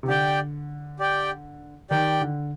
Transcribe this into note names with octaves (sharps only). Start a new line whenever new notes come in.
C3
D3 G4 D5 G5
G4 D5 G5
D#3 G4 D5 G5
D3